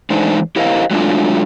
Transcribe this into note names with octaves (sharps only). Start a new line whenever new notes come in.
E3 G#3 A3 D4 D#4 C5
E4 G4 A#4 C5 D#5 F5
F#3 G#3 A3 D4 F4